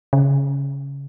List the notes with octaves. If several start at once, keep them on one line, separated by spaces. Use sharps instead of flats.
C#3